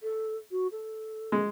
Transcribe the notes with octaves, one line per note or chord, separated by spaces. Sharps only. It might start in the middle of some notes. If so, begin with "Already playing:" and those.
A4
F#4
A4
G#3